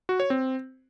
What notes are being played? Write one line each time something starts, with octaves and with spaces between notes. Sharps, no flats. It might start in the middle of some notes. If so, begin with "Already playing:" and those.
F#4
C#5
C4